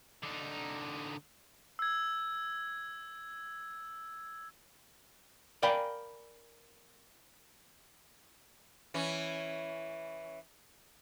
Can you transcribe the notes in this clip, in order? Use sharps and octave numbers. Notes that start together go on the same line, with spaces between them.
D3 D#4
E6 G#6
A#4 D5 F5 G5 G#5 B5
E3 C#4